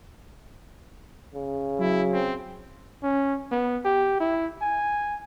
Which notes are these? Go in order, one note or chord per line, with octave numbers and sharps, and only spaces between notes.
C#3
F#3 E4
C4
C#4
B3
G4
E4
G#5